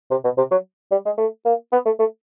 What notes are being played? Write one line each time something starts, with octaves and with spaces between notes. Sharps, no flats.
C3
B2
C3
F#3
G3
G#3
A3
A#3
B3
A3
A3